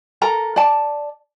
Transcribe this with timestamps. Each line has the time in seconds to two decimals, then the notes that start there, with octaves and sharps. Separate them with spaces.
0.22 A4 A#4 A#5
0.56 D5 A5